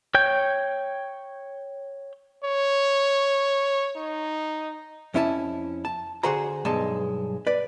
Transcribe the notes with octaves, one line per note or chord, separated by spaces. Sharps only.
C#5 G5 G6
C#5
D#4
F2 C#4 E4 A4 A5
A5
D3 F#4 G#4 C5 A#5
B1 G2 G#3 A5
B4 D5